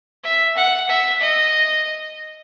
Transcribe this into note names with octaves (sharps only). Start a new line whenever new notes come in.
E5
F#5
E5
D#5